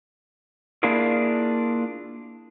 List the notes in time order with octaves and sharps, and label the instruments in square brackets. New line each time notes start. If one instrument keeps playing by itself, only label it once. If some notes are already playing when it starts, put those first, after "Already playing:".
[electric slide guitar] A#3 D4 E4 F4 G#4 A#4